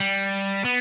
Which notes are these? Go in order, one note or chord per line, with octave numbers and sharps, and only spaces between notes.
G3
B3